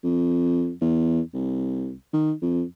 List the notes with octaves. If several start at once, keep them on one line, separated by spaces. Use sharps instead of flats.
F2
E2
C2
D#3
F2